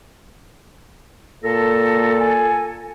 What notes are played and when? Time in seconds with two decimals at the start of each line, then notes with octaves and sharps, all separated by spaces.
1.44 A#2 A4 A#6
2.18 G#5